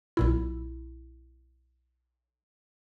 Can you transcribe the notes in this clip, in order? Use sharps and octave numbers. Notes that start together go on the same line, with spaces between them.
B1 A#2 E4